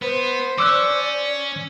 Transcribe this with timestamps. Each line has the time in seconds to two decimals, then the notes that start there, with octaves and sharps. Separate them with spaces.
0.02 B3 B4 C5
0.58 C#4 D5 D6 E6 F#6